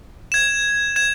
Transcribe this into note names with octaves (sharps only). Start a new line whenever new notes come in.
G#6 E7
G#6 E7